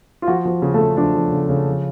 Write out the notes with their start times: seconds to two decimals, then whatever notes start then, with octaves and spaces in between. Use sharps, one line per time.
0.22 F4
0.27 F3 F#4
0.45 F3
0.62 C#3
0.74 A3 A4
0.80 C#3
0.97 F3 D4 D5
1.15 F3
1.32 C#3
1.49 C#3
1.66 F3